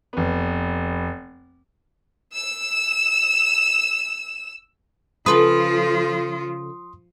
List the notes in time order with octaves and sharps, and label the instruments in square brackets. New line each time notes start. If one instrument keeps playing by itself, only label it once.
[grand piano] F1 B3
[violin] E6 E7
[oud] C#3 A4 B4 [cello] F3 F4 [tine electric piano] C6 D#6